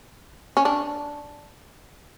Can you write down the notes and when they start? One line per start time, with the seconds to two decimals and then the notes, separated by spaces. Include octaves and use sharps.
0.57 C#4
0.65 D4